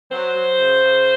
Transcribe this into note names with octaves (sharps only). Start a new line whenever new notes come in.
F#3 C5
F#3
C#3
C#3